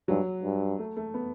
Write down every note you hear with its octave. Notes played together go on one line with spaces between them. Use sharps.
G2 F#3
G2
A3
A3
B3